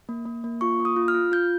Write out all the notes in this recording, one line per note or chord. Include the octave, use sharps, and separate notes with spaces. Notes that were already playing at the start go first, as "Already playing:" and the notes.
A#3
A#3
A#3
F4 C#6
A#3
D#6
F4
F6
F4
F4 G6